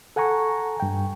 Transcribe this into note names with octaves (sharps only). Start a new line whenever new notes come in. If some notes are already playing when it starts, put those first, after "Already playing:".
A4 F#5 G#5 A#5 C#6
G2 G5